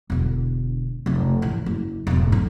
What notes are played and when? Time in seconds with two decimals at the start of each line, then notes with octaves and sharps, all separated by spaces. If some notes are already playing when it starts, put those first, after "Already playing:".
0.10 E1 D3
1.06 F1 C#3
1.42 A#1 E3
1.66 F#1
2.07 E1 G#2
2.32 D3 C#4